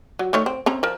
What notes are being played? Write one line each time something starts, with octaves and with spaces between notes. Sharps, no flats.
F#3
D#3 A3 C#5
C4
C4 C#4 A#5
F3 A#4